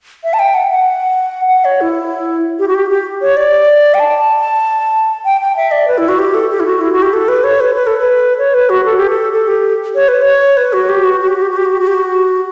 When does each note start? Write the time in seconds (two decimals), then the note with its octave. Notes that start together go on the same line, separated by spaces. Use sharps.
0.24 E5
0.33 A5
0.39 G5
0.54 F#5
0.71 F#5
1.48 F#5
1.65 C#5
1.81 E4
2.59 G4
2.68 F#4
2.74 G4
2.90 G4
3.22 C#5
3.37 D5
3.94 G5
4.00 A5
5.25 G5
5.41 G5
5.56 E5
5.71 D5
5.88 B4
5.98 E4
6.08 F#4
6.19 G4
6.34 A4
6.50 G4
6.60 E4
6.66 F#4
6.81 E4
6.92 F#4
7.02 G4
7.13 A4
7.28 B4
7.44 C#5
7.60 B4
7.75 B4
7.87 A4
7.98 B4
8.38 C#5
8.54 B4
8.69 F#4
8.85 A4
8.97 G4
9.10 A4
9.32 A4
9.47 G4
9.95 C#5
10.08 B4
10.22 C#5
10.57 B4
10.73 F#4
10.89 G4
11.04 F#4
11.20 F#4
11.27 G4
11.35 F#4
11.42 G4
11.50 F#4
11.57 G4
11.65 F#4
11.72 G4
11.80 F#4
11.87 G4
11.94 F#4